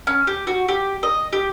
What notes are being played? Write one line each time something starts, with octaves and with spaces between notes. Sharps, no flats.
C#4
G4
F#4
G4
D#5
G4